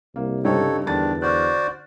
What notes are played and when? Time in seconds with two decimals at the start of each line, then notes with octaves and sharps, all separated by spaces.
0.16 C2 A#3
0.45 G2 C#3 D#4 G4 A4 C5 C#5
0.86 E2 D3 D#3 D4 A6
1.22 F#4 C5 D5 F6 F#6